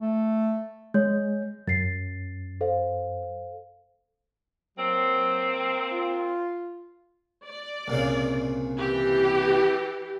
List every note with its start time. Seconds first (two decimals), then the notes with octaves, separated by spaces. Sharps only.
0.01 A3
0.94 G#3 C#5 G6
1.68 F#2 A6 C7
2.61 A4 C5 F5
4.77 F#3 A#3 C4
5.90 F4
7.46 D5
7.88 C2 A#2 C#3
8.78 E3 G4